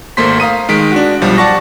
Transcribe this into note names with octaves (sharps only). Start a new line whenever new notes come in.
G#1 A3 A#3 C5 C6 B6
F5 A#5 D#6 D#7
D#3 G#3 B6 D7
D4 F#4
B1 F3 G3
D5 F#5 A5 C#6 A#6